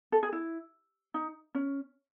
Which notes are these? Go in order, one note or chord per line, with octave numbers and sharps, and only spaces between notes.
A4
G#4
E4
D#4
C#4